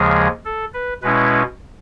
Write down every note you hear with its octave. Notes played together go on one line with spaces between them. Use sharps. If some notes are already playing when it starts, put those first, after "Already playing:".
Already playing: D#2 C#3 F3 G#3 G#4
A4
B4
B2 G#3 C#4 E4 B4